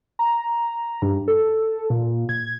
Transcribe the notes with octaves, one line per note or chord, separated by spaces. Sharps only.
A#5
G2
A4
A#2
G#6